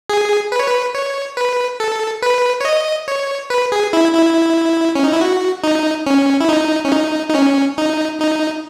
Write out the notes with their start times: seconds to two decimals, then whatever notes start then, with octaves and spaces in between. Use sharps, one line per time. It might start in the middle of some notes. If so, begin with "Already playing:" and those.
0.10 G#4
0.52 B4
0.59 C#5
0.67 B4
0.95 C#5
1.37 B4
1.80 A4
2.22 B4
2.61 C#5
2.65 D#5
3.08 C#5
3.50 B4
3.72 G#4
3.93 E4
4.15 E4
4.95 C#4
5.04 D#4
5.12 E4
5.21 F#4
5.64 D#4
6.07 C#4
6.41 E4
6.49 D#4
6.85 C#4
6.92 D#4
7.30 D#4
7.35 C#4
7.78 D#4
8.20 D#4